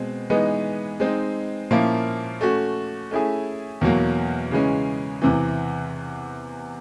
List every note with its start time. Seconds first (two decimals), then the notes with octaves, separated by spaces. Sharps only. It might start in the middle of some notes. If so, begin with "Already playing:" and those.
Already playing: B2 G#3 C4
0.30 E3 G#3 B3 D#4
1.00 G#3 C4 D#4
1.71 A#2 F3 A#3 C#4 E4
2.41 A3 C#4 F#4
3.11 A3 C#4 E4 G#4
3.81 E2 B2 F#3 A#3
4.51 C#3 E3 G#3 C#4
5.22 E2 C3 E3